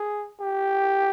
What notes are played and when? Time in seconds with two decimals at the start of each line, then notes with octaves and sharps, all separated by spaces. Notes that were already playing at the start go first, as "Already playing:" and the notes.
Already playing: G#4
0.41 G4